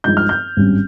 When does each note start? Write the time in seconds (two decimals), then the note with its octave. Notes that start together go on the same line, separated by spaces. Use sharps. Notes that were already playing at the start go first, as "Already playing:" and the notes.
0.04 G2 F3 G#3 D#4 G6
0.17 F6
0.29 G6
0.56 G#1 G2 G3 C#4